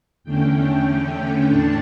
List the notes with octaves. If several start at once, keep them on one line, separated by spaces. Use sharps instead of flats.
E2 D3 A3 C#4 G5
A2 E3 A3 D4 A5